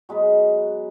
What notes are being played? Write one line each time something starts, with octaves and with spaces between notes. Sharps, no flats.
F#3 G#3 B3 B4